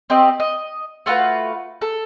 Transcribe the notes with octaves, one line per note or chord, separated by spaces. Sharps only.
C4 G4 D#5
D#5
A3 F4 F#4 B4
A4